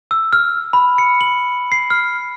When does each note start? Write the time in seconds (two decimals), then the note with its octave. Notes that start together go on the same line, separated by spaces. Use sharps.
0.11 E6
0.33 F6
0.73 B5
0.98 C#7
1.21 F#7
1.72 C7
1.90 F6